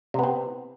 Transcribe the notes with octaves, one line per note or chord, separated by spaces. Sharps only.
C3 B3 C4